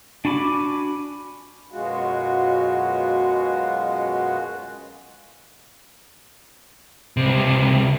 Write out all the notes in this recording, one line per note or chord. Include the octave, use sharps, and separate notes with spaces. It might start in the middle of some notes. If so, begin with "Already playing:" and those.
D4 F#4 G#5 B5 D6
F#2 B2 G#3 F4 F#4
C#2 C3